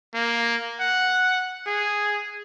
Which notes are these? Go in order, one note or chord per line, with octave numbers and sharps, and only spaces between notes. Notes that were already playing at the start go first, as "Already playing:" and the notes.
A#3
F#5
G#4